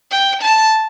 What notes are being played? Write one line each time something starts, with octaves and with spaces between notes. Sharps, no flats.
G5
A5